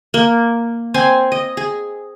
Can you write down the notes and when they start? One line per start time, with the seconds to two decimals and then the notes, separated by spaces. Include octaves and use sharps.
0.14 A#3
0.94 C4 G#5 C6
1.32 D#5
1.57 G#4